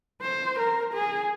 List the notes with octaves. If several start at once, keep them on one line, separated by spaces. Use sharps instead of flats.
C5
A#4
G#4